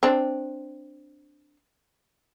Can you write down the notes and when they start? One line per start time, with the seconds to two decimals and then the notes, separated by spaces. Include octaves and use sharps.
0.03 C4 D4